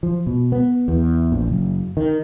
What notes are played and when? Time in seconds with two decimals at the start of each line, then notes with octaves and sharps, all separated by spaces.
0.03 F3
0.27 B2
0.52 B3
0.88 E2
1.32 A#1
1.48 F#1
1.97 D#3